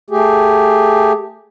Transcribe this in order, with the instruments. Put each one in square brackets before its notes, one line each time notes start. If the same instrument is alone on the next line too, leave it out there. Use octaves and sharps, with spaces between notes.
[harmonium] A3 G4 G#4